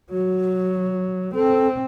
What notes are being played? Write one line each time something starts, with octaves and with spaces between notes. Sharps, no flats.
F#3 F#4
C4 A4